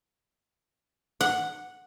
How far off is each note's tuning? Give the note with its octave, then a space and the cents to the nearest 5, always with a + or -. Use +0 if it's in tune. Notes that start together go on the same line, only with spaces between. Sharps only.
F#5 -5